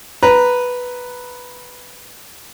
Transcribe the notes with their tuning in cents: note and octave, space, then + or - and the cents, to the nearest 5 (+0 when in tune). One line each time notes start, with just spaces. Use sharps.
B4 +0 A#5 +0